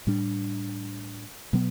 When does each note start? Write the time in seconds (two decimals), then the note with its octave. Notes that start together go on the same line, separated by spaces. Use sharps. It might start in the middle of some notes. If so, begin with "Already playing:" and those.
0.07 A2 G3 D4
1.53 B2 F#3 B3